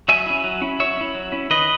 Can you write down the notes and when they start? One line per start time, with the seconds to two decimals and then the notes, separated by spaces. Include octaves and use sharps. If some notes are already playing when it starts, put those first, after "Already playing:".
0.08 F#3 E5 G#5
0.26 C#4 E4
0.44 F#3
0.62 C#4 E4
0.79 F#3 C#5 E5
0.97 C#4 E4
1.14 F#3
1.32 C#4 E4
1.50 D#3 B4 D#5